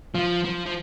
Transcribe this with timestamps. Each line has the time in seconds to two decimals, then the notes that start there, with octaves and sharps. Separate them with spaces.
0.15 F3
0.44 F3
0.66 F3